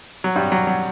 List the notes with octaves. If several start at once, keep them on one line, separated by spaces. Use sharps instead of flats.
F#3
G2 G3
F#3
F#3